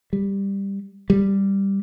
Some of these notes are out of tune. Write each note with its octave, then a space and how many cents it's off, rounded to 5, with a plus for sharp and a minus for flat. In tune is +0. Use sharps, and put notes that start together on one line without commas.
G3 +10
G3 +5